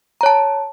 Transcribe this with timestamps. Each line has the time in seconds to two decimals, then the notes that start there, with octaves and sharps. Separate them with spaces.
0.21 A#5
0.23 C#5
0.26 A5